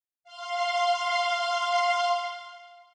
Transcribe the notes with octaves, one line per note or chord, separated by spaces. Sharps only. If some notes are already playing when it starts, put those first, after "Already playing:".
F5 C6